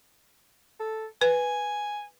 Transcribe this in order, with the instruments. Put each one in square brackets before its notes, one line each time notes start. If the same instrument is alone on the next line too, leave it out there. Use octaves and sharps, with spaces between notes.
[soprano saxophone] A4
[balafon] B4 [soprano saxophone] G#5